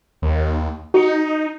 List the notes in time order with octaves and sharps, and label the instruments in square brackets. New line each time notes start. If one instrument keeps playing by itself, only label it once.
[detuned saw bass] D#2
[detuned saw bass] D#4 [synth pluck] F#4 C#7